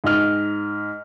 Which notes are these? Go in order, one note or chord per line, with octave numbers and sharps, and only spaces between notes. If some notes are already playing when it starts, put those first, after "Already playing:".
G#2 D#5 F6